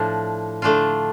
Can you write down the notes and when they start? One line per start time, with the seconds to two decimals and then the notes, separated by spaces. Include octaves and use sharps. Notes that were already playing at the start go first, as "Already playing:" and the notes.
Already playing: A2 F3 D4
0.62 D3 A3 D4 F4